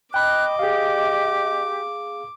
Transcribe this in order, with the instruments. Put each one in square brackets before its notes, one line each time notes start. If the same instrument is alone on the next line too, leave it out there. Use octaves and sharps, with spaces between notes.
[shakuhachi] D#5 [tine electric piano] G5 B5 [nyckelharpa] D6 [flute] F#6
[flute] G4 [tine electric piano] G#4 F5